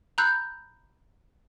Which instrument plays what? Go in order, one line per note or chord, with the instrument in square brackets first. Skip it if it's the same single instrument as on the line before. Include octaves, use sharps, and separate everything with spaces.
[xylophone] A#5 B5 E6 F#6 G6